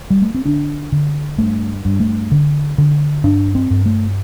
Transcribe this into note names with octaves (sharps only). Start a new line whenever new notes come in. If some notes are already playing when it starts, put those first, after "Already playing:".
G3
A3
C4
D3 D4
D3
G2 A3
G2
A3
D3
D3
G2 D4
C4
G2
A3